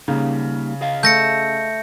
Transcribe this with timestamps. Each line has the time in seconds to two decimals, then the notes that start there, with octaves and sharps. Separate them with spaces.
0.08 C#3 G3 A#3 D#4
0.81 G#4 D#5 F5
1.03 A3 G6 A#6 C#7